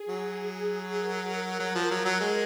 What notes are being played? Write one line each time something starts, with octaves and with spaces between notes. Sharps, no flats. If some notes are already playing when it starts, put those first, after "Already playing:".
Already playing: G#4
F#3
G#4
A#4
F#3
F3
F#3
F#3
G#3